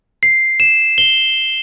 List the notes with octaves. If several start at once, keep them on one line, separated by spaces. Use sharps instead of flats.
C7
E7
G7